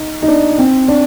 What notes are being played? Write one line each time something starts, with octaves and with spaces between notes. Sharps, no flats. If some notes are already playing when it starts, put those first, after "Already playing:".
Already playing: D#4
D#4
D4
C4
D4